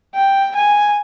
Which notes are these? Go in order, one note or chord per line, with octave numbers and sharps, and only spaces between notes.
G5
G#5